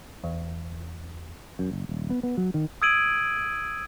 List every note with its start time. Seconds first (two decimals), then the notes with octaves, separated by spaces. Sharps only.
0.24 E2
1.59 F#2
1.71 F#1
1.89 D#1
2.10 B3
2.23 B3
2.37 F#3
2.54 D#3
2.82 D#6 E6 G#6 D7 D#7 F#7